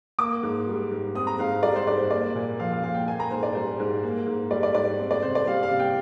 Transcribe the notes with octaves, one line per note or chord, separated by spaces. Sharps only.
A#3 D6
G#2
G3
G#2
C4 D#6
A#5
G#2 F5
G3 D5
C5
G#2 D5
C5
A#3 D5
A#2
F3 F5
F5
A#2 F5
G5
A#3 G#5
A#5
G#2 C5
D5
G3 C5
G#2
A#3
G#2
G3 D5
D5
G#2 D5
C4
D5
C3 C5
D5
G3 F5
F5
C3
G5